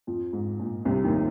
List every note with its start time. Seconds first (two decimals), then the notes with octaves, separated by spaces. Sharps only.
0.07 F2 F3
0.33 G#2
0.60 A#2
0.85 C2 C3
1.04 D#2 D#3